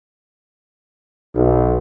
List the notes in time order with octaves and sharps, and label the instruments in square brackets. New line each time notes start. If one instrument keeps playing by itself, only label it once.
[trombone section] B1